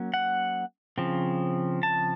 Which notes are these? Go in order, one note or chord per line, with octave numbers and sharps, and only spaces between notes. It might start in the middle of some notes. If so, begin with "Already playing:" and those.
Already playing: F#3 A#3 C#4
F#5
C#3 F3 C4
A5